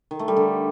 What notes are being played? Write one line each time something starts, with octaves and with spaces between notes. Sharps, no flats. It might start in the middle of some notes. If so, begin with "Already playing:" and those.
D#3
A3
G3
D3